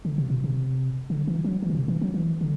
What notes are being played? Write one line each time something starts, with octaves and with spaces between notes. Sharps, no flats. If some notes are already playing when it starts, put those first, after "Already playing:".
D3
C3
B2
C3
D3
E3
F#3
E3
D3
C3
E3
F#3
E3
D3